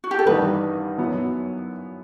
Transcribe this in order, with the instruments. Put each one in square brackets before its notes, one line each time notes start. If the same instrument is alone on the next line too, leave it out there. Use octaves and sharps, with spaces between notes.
[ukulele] F#4
G4
A4
[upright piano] A1 G2 D#3 G3 D#4 [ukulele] B4
[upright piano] F#2 F#3 B3 E4